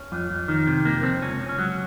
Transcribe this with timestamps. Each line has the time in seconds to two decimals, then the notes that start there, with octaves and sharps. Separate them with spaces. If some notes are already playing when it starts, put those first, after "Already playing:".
Already playing: C#4
0.12 F2
0.30 F2
0.48 D#3
0.67 C3
0.85 F2 A#3
1.03 F2 C4
1.22 C#2 C#4
1.40 C#2
1.49 C#4
1.59 F#3